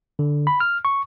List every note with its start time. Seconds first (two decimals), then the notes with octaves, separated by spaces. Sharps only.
0.19 D3
0.47 B5
0.60 F6
0.85 C#6